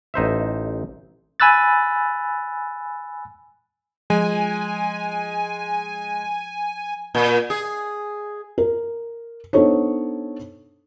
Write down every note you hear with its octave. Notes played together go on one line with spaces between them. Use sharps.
A1 D#4 C5 E5
G#5 B5 E6 F#6 A6
F3 G#3 G#5
A#2
G#4
A#4
B3 D4 D#4 A4 C5 C#5